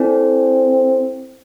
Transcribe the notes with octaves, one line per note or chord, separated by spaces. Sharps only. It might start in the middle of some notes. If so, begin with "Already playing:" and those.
Already playing: C4 E4 A4 D5 G#5